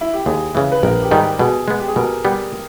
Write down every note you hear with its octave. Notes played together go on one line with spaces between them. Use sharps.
E4
G4
D#2 G#4
C#3 E3
B4
A#1 A#4
G4
G#2 D#3 G3
G4
B2 G#4
G#3 B3
G4
G#4
B2 A#4
G3 B3